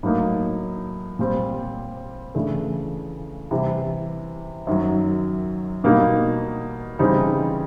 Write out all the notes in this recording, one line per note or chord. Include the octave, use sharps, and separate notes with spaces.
A2 F#3 A#3 D#4
A#2 G3 C4
C#3 E3 A3 D4
C3 E3 G3
F#2 D#3 F#3
B2 G3 A#3 D#4
C#3 E3 G3 C4 D#4